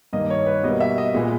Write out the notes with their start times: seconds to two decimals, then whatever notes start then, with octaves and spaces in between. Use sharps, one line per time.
0.13 G2 D#3 A#3 D#5
0.30 C#5
0.46 B4
0.63 B2 G3 A#3 D#5
0.80 E5
0.98 D#5
1.14 A#2 G#3 B3 G#4